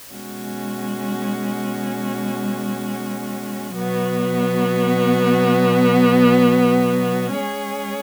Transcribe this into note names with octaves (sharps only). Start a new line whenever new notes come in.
B2 G#3 C#4 F#4
B2 F#3 B3 F#4
G#3 C#4 G#4 C#5